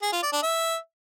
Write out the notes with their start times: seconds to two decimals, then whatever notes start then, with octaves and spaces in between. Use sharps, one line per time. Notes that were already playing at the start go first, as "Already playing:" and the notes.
0.02 G#4
0.12 F4
0.22 D5
0.32 D4
0.42 E5